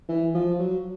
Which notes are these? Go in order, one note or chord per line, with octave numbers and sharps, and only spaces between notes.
E3
F3
F#3